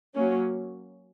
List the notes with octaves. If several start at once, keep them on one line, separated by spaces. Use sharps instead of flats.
F#3 A#3 C#4